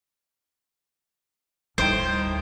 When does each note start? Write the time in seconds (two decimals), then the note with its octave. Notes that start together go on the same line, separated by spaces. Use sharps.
1.78 D2 A2 G3 D#4 C5 G5 C7 D7